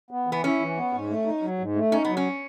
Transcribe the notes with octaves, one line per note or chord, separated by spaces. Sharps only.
B3
E3
B3
C#4 E4
E3
B3
G#2
A3
D#4
F#3
G#2
A3
C#4 D#4
F#3 B3
C#4